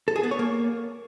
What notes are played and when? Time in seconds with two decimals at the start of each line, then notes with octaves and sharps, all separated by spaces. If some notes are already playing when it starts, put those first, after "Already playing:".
0.08 A4
0.16 G#4
0.23 B3
0.31 C#5
0.39 A#3